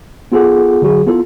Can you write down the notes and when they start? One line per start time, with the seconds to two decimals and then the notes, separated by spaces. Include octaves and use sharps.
0.32 B3 F4 G#4 A4 F#5
0.82 D3 F#3 F#4 G#4
1.07 B3 E4 F4 A4